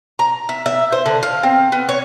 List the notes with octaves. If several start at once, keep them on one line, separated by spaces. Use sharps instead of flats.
A#5
E5
E5
C5
D3
F5
C4
B3
C#5